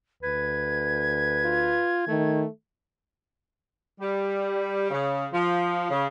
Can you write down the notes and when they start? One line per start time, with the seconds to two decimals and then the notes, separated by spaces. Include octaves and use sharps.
0.23 D2 B4 G#6
1.44 F4
2.07 D#3 A3
4.00 G3
4.90 C#3
5.32 F3
5.90 C#3